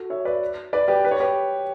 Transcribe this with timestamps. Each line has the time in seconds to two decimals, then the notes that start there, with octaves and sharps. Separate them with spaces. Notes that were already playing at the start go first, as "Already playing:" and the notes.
Already playing: F#4 A4
0.10 C#5 E5
0.25 B4 D5
0.73 B4 D5
0.88 G4 B4
1.05 B4
1.11 C#5
1.20 G4 B4